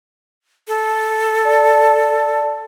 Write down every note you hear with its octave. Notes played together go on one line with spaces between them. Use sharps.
A4
D5 A5